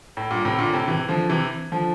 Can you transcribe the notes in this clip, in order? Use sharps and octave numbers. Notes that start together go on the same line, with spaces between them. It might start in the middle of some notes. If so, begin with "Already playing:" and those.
A2
G2 A#2
A2 C3
A#2 D3
A2 C3
C3 E3
D3 F3
C3 E3
D3 F3